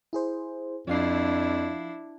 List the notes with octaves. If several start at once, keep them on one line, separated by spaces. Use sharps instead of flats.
E4 G#4 C5
F2 F3 D4 E4 F5 C7